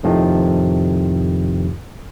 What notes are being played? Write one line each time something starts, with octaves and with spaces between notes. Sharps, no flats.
F2 A2 C3 D#3 F3